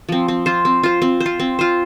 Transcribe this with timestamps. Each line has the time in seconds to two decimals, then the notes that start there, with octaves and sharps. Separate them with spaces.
0.09 F3 C4
0.28 C4
0.46 F4 C5
0.65 C4
0.83 F4 C5
1.02 C4
1.20 C5
1.26 F4
1.40 C4
1.59 F4 C5